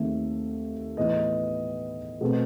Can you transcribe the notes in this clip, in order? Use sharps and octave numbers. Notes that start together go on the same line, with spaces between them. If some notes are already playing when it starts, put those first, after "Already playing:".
Already playing: D#2 D#3 A3 C4 E5
A2 E3 B3 D#5
B2 A3 C4